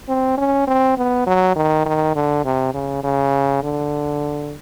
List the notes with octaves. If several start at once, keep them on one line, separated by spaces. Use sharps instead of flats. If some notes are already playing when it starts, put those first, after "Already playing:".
C4
C#4
C4
B3
F#3
D#3
D#3
D3
C3
C#3
C#3
D3